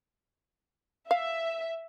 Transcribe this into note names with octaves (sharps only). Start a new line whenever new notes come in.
E5 F5